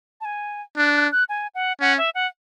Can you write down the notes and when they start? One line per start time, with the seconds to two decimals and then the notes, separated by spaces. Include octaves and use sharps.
0.21 A5
0.25 G#5
0.77 D4 F#6
0.94 F#6
1.12 F#6
1.29 G#5
1.55 F#5
1.81 C#4 F#5
1.98 E5
2.15 F#5